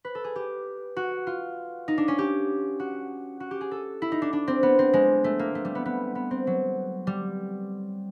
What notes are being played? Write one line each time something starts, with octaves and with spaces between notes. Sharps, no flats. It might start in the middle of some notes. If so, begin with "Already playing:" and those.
B4
A4
G#4
G4
F#4
F4
D#4
D4
C#4
G4
F#4
F#4
G4
G#4
A4
E4
D#4
D4
D4
C4
B3
C4
G#3
A3
A#3
A3
G3
B3
B3
B3
C4
F#3
G3